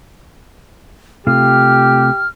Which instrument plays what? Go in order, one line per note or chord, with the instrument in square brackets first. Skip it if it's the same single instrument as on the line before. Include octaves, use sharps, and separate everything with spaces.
[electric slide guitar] C3 A3 F4 [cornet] G4 [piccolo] F6